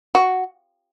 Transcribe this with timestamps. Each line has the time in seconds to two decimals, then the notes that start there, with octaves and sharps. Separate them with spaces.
0.15 F#4